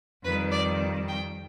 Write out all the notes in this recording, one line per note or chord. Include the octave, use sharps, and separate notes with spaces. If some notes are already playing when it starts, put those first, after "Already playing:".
F2 D#3 G3 B4
D5
G5